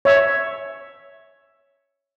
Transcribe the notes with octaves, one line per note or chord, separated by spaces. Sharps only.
C#5 E5